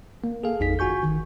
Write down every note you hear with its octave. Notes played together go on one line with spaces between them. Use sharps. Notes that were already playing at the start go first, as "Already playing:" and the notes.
A#3
G#4 A4 F5
A1 F2 D#4 G#4 B6
G1 F#4 G#5 C#6 G6
D#3